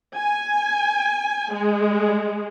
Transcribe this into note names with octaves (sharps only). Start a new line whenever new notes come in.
G#5
G#3